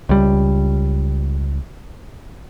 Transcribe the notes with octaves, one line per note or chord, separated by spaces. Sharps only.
C#2 G3